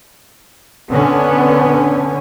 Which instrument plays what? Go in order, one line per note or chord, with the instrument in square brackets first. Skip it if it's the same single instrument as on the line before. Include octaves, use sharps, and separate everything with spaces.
[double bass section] D3 C#4 [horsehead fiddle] B3